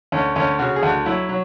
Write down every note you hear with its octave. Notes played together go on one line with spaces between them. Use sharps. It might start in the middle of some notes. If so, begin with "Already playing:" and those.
D2 C#4
D2 C#4
C#3 F#4
G#4
D2 F#4
F#3 E4
F#3